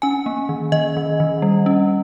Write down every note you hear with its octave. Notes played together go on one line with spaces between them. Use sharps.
C#4 G#5
A#3
D#3
D#3 D#5
D#3
D#3
G3
C#4